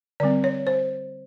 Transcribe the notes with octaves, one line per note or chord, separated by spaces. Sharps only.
D3 G3 C4 D5
C#5
C5